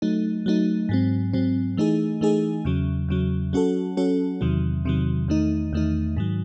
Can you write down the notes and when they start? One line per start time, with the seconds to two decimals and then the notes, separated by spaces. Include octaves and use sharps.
0.02 F#3 A3 D#4
0.46 F#3 A3 D#4
0.89 G#2 F#3 C4
1.33 G#2 F#3 C4
1.77 E3 A3 D#4 G#4
2.21 E3 A3 D#4 G#4
2.65 E2 C#3 F#3
3.09 E2 C#3 F#3
3.53 F#3 C#4 F#4 A4
3.97 F#3 C#4 F#4 A4
4.41 E2 C3 D#3 F#3
4.85 E2 C3 D#3 F#3
5.28 E2 D#3 A3 D#4
5.73 E2 D#3 A3 D#4
6.17 G#2 D#3 F#3